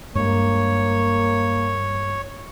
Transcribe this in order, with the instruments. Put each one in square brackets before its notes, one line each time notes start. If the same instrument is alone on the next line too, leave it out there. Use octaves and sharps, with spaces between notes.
[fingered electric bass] G2 G#3 [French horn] A#3 [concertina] C#5